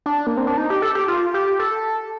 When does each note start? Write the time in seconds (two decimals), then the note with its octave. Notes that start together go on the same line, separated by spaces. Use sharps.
0.06 D4
0.27 A#3
0.37 C4
0.47 D4
0.57 D#4
0.70 G4
0.82 A4
0.95 G4
1.08 F4
1.34 G4
1.59 A4